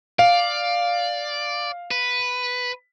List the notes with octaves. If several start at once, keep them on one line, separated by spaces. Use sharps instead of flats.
D5 F5
B4